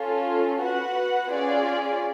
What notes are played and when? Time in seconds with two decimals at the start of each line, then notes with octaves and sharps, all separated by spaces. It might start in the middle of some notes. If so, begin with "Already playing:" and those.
Already playing: C#4 F4 A4
0.60 F#4 B4 F#5
1.29 C#4 F4 G#4 D5